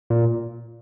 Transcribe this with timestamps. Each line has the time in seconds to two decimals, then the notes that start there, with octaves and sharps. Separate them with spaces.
0.10 A#2